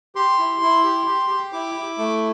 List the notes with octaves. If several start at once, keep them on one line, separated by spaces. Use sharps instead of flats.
G4 C6
E4
E4
G4
G4
G4
E4 D6
E4
A3